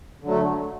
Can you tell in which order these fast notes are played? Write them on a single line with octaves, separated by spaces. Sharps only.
D3 F#3 A3